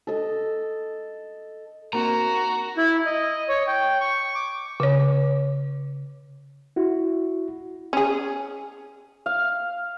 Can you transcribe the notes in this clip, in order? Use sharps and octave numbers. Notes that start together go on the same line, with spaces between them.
A4 D#5
A#3 C4 D#4 F#4 A#5
E4
D#5
C#5
G5
C#6
D6
C#3 C#5
E4 F#4
C#4 G#4
F5